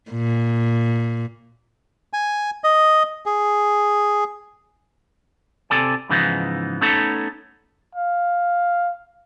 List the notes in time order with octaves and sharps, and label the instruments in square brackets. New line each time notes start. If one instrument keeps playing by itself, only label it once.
[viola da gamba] A#2
[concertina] G#5
D#5
G#4
[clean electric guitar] C3 A4 D5 G#5
G#2 C#3 E3 F3 B3 D#4
A3 B3 C#4 D#4 A4 C#5
[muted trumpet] F5